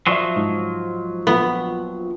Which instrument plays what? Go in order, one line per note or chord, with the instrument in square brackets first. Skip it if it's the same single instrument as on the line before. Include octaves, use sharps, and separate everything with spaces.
[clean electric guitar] F3 F#3 [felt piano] D5 E5
[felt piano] G#2
[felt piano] A#1 [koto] B3